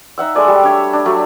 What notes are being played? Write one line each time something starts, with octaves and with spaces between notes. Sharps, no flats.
D#4 E5 F#5 E6
G#3 A3 D5 G#5
G3
D4 C#5 E5
D4
F#3 A3 D4